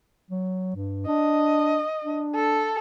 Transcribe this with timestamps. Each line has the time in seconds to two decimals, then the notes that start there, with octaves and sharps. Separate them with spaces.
0.30 F#3
0.75 G2
1.07 D4 D#5
2.05 D4
2.35 A4